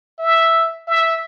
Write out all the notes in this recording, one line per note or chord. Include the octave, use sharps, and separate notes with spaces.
E5
E5